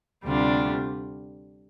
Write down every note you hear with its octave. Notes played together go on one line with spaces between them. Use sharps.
D2 C3 G3 D4 F4